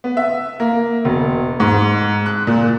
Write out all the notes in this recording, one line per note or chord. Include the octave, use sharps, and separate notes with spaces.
B3
E5
A#3
E1
G#2
F#6
A#2